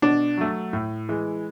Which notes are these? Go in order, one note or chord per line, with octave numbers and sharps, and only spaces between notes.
B2 D4
F#3 A3
A2
E3 G#3